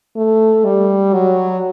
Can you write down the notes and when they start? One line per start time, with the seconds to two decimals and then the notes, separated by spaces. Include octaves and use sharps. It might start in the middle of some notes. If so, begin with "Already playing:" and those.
0.16 A3
0.64 G3
1.13 F#3